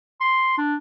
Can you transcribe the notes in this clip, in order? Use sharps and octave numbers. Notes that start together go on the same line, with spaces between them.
C6
D4